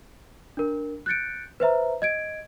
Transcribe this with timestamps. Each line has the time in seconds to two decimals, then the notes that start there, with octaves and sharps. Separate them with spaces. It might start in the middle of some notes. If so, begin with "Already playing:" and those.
0.57 D4 A#4
1.06 F#6 G6 A6 C#7 D7
1.60 B4 C5 E5 A#5
2.02 D#5 G#6 D7